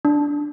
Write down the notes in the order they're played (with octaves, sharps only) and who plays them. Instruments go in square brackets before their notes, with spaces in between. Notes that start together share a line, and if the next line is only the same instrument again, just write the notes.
[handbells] D4